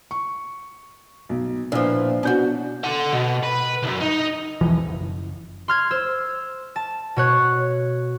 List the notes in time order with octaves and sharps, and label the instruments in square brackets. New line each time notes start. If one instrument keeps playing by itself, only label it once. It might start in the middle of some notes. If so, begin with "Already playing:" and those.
[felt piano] C#6
B1
[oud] A#2 F3 [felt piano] D4 E4 B4
[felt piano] B2 D4 G6 [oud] C#4 F#4
[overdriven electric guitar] A4 F#5
B2
B4
C2 F#2
D#4
[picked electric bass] B1 E2 E3 F3
F#1
[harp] C6 F6 G#6
C5 E6
A5
B2 C#5 F#6